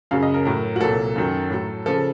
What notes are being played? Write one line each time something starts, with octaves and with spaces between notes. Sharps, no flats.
F#2 C#3 F#3 F5
D#5
A#4
A2 F#3 A#4
F#4
C2 A#2 F#3 A4
F#2 D#3 F#3
A2 F#3
C#3 F3 A4